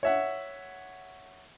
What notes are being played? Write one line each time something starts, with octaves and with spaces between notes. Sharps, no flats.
C#5 E5 F#5